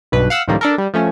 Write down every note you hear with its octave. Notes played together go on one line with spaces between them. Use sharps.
B1 G2 B2 B4
F5 F#5 E6
C#2 A2 D#3 F3 G3 A#3
D4 A4 A#4
G3
F3 A3 C#4